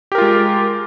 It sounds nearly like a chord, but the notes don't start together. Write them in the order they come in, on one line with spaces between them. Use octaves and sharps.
G4 A#4 F4 G#3